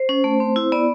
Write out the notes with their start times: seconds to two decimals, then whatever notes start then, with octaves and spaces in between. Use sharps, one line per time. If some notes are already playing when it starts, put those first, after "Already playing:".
Already playing: C5
0.09 C#4
0.24 A3
0.40 C4
0.56 E4
0.72 B3 D5